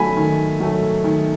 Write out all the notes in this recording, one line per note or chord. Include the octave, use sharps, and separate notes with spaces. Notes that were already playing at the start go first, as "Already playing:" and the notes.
Already playing: D#3 F#3 A3 G#5 B5
D#3
F#3 A3
D#3